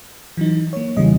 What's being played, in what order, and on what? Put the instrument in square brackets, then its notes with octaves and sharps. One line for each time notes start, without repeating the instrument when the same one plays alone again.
[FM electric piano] E3 F#3 D#4
A#3 C#5
[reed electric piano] E2 C#3 E3 [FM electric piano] G3 D#5